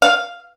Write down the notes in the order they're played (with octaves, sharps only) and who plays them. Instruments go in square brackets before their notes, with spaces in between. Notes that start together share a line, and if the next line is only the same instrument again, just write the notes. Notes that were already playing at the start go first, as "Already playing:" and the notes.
[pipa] F5